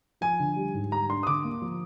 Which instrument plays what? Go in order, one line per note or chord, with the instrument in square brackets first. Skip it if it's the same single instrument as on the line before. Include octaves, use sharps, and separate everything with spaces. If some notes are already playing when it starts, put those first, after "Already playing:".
[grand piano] F3 [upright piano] G#5
[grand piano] D3
G3
G#2
[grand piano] G3 [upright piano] A#5
[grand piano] D4 [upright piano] C6
[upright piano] D#6
[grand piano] D3 [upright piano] D6
[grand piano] A#3
F3